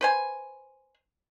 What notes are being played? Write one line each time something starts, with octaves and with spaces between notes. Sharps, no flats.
B4 C5 G#5